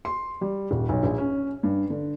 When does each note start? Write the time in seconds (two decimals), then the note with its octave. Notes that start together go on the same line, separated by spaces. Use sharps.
0.05 C6
0.41 G3
0.71 D#1
0.89 B1
1.03 A#1
1.18 C#4
1.63 G2
1.90 D3